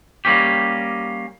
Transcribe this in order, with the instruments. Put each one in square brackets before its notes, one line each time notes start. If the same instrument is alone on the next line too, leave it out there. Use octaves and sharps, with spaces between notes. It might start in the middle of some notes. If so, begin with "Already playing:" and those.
[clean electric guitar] G3 A#3 C#4 G4